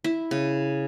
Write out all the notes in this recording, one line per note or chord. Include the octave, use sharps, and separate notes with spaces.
E4
C#3